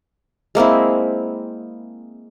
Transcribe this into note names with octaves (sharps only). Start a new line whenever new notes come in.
G#3 A#3 C4 E4